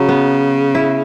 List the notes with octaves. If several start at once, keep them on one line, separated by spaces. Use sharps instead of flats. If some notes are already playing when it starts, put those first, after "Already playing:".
Already playing: C#3 F#3
B3
E4